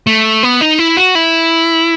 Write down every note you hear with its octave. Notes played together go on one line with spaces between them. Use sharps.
A3
B3
D#4
E4
F#4
E4